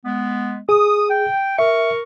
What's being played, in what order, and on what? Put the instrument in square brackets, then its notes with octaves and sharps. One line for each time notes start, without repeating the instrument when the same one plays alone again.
[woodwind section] G#3 B3
[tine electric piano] G#4 [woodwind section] D#6
[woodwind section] G5
[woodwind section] A#4 C#6 [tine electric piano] E5